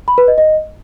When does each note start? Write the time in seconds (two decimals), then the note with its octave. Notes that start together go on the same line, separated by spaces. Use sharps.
0.08 B5
0.18 B4
0.28 D#5
0.38 D#5